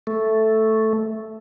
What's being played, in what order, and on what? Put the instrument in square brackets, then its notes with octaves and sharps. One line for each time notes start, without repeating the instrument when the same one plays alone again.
[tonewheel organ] A3